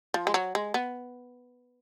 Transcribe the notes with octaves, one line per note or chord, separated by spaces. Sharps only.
F3
G#3
F#3
G#3
B3